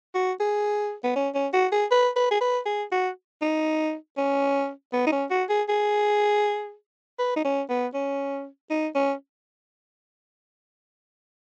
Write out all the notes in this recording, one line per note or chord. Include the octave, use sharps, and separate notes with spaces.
F#4
G#4
B3
C#4
C#4
F#4
G#4
B4
B4
G#4
B4
G#4
F#4
D#4
C#4
B3
D#4
C#4
F#4
G#4
G#4
B4
D#4
C#4
B3
C#4
D#4
C#4